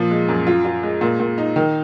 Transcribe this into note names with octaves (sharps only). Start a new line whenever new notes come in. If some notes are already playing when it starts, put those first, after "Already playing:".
Already playing: A#2 F3
G#3
F#2
F4
F4
G#3
A#2
A#2
D#4
D#3